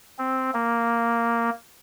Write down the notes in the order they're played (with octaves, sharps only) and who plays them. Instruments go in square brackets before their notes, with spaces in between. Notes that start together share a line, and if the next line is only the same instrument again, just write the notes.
[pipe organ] C4
A#3